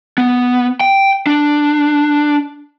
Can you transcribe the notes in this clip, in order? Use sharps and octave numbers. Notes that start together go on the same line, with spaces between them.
B3
G5
D4